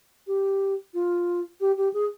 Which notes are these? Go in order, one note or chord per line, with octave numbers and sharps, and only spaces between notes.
G4
F4
G4
G4
G#4